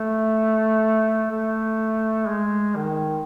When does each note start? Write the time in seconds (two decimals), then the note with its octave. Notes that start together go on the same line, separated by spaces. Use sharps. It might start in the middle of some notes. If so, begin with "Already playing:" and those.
Already playing: A3
1.31 A3
2.28 G#3
2.76 D#3